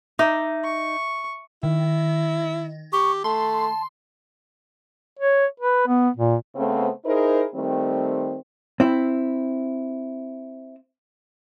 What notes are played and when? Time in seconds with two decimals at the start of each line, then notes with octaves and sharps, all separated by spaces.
0.19 D#4 E5 D6
0.64 C#6
1.63 D#3 E4
2.93 G4 C#6
3.24 A3 A5 C6
5.19 C#5
5.60 B4
5.88 B3
6.17 A#2
6.56 C#3 A3 B3 C4
7.05 D#4 E4 G#4 A#4 C5
7.54 D#3 G3 A3 C4
8.80 C4 E4